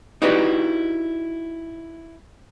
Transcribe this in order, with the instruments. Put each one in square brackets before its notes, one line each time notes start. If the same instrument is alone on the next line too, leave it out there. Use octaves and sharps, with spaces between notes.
[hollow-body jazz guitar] D#4 E4 F#4 G4 B4 D5